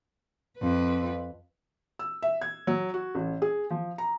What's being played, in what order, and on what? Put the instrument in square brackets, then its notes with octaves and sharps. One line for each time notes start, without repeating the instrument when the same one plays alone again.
[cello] F2 B4
[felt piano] E6
E5
G#6
F#3
F#4
A1
G#4
F3
A#5